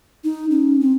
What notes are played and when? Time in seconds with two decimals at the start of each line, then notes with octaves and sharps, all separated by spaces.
0.24 D#4
0.51 C#4
0.80 C4